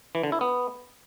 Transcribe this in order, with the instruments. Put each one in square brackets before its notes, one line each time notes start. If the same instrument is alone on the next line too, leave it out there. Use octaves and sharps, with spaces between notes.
[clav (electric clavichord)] E3
D3
E4
B3